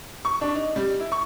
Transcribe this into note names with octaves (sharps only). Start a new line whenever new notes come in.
C#6
D4
D#4
G3
E4
C#6